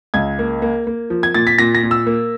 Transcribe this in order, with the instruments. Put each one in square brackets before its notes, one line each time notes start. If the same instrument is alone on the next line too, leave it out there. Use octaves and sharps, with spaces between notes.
[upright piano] C#2 G#6
A#3
A#3
A#3
F3
G#6
A#2 A6
B6
A#2 A#6
A#6
A#2
E6
A#3